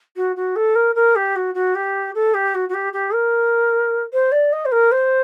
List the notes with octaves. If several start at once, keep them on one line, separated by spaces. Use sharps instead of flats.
F#4
F#4
A4
A#4
A#4
G4
F#4
F#4
G4
A4
G4
F#4
F#4
G4
G4
A#4
C5
D5
D#5
C5
A#4
C5